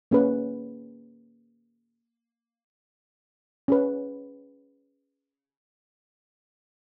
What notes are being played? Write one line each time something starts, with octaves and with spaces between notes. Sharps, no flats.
A#3 C#4 G#4 B4
C#4 G#4 B4